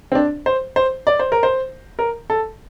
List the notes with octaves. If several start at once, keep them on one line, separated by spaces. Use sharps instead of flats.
C4
D4
C5
C5
D5
C5
A#4
C5
A#4
A4